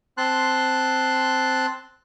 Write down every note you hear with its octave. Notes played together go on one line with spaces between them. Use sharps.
C4 A5 C6 F#6